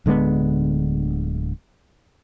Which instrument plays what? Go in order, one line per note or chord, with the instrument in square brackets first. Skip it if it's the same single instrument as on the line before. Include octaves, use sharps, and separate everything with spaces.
[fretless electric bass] D1 D3 G#3 B3